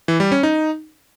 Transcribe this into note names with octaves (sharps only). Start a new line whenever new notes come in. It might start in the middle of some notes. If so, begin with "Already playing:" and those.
E3
G3
C#4
D#4